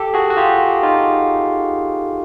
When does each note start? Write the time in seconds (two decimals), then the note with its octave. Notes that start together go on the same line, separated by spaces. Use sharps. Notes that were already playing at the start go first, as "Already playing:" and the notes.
Already playing: G4 A4
0.14 F#4 G#4
0.30 F#4
0.37 F4 G4
0.83 D#4 F4